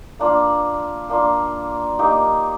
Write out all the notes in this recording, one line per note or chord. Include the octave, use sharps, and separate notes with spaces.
A#3 D4 F4
A#3 D4 F4
A#3 D#4 G4